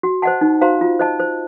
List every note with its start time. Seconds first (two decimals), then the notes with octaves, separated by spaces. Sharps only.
0.03 F#4
0.22 C5 D#5 F#5 A5
0.41 D#4
0.61 F#4 C5 F5 A#5
0.81 F4
0.99 C5 D#5 A5
1.19 C5